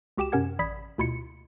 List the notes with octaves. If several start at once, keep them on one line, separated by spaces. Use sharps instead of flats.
C#2 F#4 G4 G5 D6 E7
F#2 C3 C#4 A#4 F#5 G#6
A1 D5 B5 D#6 G#6 B6
D2 B2 E4 F4 C6 C#7